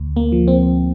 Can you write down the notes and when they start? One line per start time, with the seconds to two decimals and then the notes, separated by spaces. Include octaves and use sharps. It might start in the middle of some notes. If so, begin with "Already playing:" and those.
Already playing: D2
0.16 A#3
0.32 F3
0.48 C4